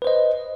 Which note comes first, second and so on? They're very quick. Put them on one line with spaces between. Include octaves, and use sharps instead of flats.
B4 C5 D#5